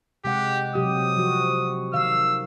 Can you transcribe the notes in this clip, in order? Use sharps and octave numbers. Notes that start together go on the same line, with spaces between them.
C3 G#3 G4 F#5
C3 F#3 G4 D#6
F3 F#4
D#3 F5 E6